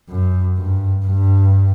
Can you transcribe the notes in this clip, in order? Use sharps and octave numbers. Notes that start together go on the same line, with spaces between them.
F#2
G2
G2